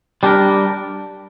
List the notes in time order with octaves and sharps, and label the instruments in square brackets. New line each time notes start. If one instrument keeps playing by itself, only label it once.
[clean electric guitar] G3 D4 G4 A#4